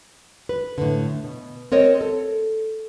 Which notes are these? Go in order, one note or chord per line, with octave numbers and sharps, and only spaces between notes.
B4
A2 D3
B2
C4 A#4 C#5 D#5
A4